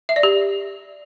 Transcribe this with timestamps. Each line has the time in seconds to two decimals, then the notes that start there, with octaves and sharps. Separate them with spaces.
0.09 E5
0.16 D5
0.23 G4